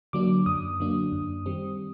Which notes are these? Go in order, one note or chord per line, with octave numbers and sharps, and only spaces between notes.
D3 F#3 A#3 D4 D6
F#2 D#6
D3 F#3 A#3 D4
F#2
D#3 G3 C4